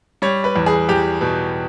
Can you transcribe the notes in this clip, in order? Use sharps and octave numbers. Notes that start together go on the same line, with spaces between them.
G3 C#5
B4
E2
G#4
E2 G4
B2